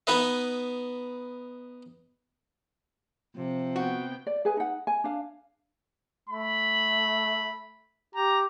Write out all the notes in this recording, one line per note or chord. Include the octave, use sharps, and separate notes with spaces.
B3 D#4 B4 D#5
C3 F3
B3 F#4 G5
D5
G#4 B4 G#5
D#4 F#5
G#5
D4 F5
A3 B5
G4 A#5